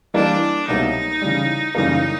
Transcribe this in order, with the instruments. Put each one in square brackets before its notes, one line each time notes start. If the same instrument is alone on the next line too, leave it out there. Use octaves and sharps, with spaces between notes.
[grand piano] E3 G3 A#3 [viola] D4
[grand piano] C2 B2 F#3 A#3 [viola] D#4
[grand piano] C#3 E3 G3
[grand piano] F#2 C#3 E3 G3 A#3 [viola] D#4